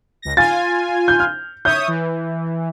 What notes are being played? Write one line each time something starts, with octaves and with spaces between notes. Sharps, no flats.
C#2 A#6
F4 G#5 A6
G6
F6
C#5 E5 D#6 G6
E3